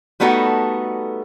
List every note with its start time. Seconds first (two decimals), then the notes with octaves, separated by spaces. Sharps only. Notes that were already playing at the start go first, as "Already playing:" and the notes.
0.20 G3 A3 B3 D#4 F#4 A4